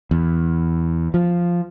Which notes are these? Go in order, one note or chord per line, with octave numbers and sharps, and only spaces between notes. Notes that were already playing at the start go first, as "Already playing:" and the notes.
E2
F3